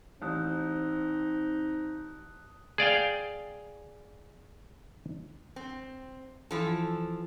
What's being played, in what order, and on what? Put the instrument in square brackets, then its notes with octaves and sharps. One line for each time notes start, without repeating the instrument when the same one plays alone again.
[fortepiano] A1 [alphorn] C4 [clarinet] D#4 [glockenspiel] A5 D#6 F#6
[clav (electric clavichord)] G#4 D5 F5 G5
[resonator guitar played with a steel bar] C4
E3 F3 A4